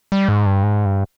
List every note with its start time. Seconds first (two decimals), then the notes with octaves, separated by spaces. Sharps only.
0.12 G3
0.28 G#2
0.46 G2
0.63 G#2
0.85 G2